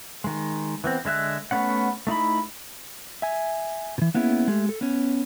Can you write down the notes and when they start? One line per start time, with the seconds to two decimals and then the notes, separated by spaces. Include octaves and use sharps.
0.24 D#3 G#3
0.84 E3 B3 C4
1.05 D3 G#3 E5 F#6
1.51 A3 B3 C#4 F#5
2.07 A3 D#4 E4 B5
3.22 E5 G#5
3.98 B2 E3
4.14 A#3 B3 C#4 E4 G#4
4.48 G#3 A3 G4
4.69 A4
4.81 B3 C#4